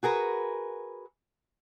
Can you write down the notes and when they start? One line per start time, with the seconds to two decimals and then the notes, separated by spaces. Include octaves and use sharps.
0.03 F#4 G#4 A#4 B4